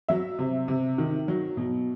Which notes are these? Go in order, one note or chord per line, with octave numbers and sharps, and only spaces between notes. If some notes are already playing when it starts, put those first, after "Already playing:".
F#3 E5
C3
C3
D#3
F#3
B2